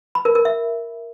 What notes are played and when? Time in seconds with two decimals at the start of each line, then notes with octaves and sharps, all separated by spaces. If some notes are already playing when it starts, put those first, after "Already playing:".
0.15 B5
0.25 A#4
0.35 A#4
0.45 E5